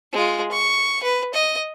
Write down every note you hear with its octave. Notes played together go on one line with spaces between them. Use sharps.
G#3 F4
C#6
B4
D#5